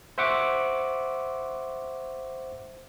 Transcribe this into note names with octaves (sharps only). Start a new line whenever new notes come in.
C5 E5 F#5 C#6 D6